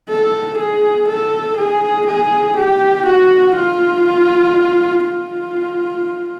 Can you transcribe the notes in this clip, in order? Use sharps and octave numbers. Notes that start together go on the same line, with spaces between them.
A4
G#4
A4
G#4
G#4
G4
F#4
F4
F4